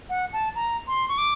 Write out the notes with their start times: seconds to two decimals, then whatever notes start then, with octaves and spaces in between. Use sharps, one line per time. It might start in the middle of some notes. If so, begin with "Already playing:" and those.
0.10 F#5
0.33 A5
0.55 A#5
0.88 C6
1.09 C#6
1.18 D6